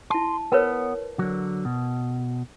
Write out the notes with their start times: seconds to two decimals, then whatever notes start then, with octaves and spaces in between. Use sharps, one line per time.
0.10 E4 A5 C6
0.52 B3 A#4 B4 C#5
1.19 D3 F#3
1.65 B2